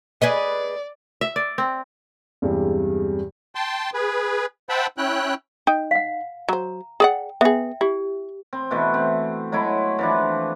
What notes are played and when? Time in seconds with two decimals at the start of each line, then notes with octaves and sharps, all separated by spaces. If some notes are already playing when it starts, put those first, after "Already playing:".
0.22 G#4 B4 D5 D#5
1.21 E5
1.36 D5
1.58 C4
2.42 E2 G2 C3 G3 G#3
3.55 G5 A5 C6
3.94 G#4 B4
4.69 C5 E5 F#5 G5 A5 B5
4.98 C#4 E4 G5 F#6
5.67 D#4 G5
5.91 F5 F#5
6.49 F#3 C5 A#5
7.00 G#4 D5 F#5 G5
7.41 B3 G#4 E5 G5
7.81 E4 G4
8.53 C4
8.71 B2 E3 A3
8.94 C4
9.52 F#3 G#3 A3 E4
9.99 E3 F3 D4